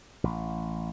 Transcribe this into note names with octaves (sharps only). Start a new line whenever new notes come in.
A1